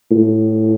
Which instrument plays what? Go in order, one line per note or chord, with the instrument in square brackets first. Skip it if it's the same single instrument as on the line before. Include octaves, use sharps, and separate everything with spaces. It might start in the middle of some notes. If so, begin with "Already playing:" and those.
[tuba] A2